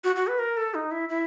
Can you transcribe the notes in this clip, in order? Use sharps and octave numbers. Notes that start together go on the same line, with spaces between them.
F#4
F#4
B4
A#4
A4
D#4
E4
E4